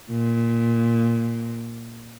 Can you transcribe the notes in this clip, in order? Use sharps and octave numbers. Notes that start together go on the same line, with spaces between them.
A#2